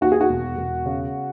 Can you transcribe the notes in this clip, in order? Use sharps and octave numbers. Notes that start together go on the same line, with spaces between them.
D#2 F#4
G#4
F#4
E1
E1
C#3